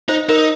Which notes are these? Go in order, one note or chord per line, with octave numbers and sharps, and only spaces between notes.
D#4 C5
D#4 A#4